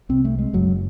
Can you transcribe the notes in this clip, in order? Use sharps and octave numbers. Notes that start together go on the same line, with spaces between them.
C2 C3 C4
A3
G#3
F#1 F#2 C#3 F#3